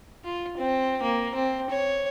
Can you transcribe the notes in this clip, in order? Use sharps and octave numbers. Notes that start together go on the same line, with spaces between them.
F4
C4
A#3
C4
C#5